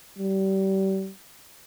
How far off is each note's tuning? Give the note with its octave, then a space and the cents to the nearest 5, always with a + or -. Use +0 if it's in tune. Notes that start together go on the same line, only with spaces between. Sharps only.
G3 -30